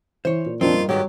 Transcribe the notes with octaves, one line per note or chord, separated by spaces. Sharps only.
E3 C5 C#5
A#2
F1 A#2 D#3 C4 D4 F4
G2
G#2 D#3 F#3 B3 G4